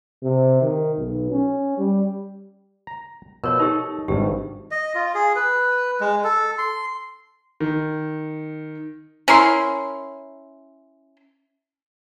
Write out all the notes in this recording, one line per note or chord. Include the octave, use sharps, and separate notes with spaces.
C3
D#3
B1
C#4
G3
A#5
B2 F3 A#4 C#5
D#4 G4 A4 D#5
G#1 G2 G4
D#5
F4
G#4
B4
G#3
A4
C6
D#3
C#4 E4 A#4 C6